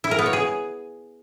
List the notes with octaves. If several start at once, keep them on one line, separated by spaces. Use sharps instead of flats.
E4
A#4
B3
C#5
G#4